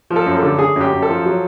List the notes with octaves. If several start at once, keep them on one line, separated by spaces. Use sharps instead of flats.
F3
A4
F#2
A4
D3
D3 G#4
F#2
G4
F#2
A4
F3
F#3